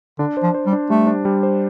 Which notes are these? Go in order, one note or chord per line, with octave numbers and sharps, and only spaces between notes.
D3 D4
C5
F3
C5
G3
D4
G3 A3
D4
G3
C5